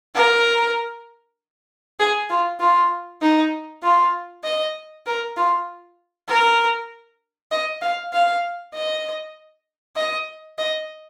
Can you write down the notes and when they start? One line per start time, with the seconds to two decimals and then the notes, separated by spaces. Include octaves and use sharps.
0.15 A#4
2.00 G#4
2.30 F4
2.60 F4
3.22 D#4
3.83 F4
4.44 D#5
5.06 A#4
5.37 F4
6.28 A#4
7.51 D#5
7.81 F5
8.13 F5
8.74 D#5
9.96 D#5
10.58 D#5